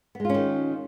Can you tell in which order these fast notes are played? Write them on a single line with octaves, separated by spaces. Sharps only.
B3 G#3 F4 C#4 D#3